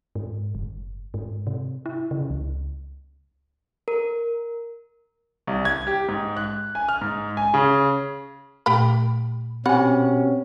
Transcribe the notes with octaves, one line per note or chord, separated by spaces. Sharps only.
G#2
F#1
G#2
C3
E4
C#3
C#2
A#4
C2
G#6
G4
G#2
F#6
G#5
F6
G#2
G#5
C#3
A#2 A3 G4 G5 B5
B2 C4 C#4 G4 F#5 G#5 B5